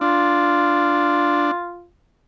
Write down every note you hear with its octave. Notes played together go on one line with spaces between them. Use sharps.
D4 F4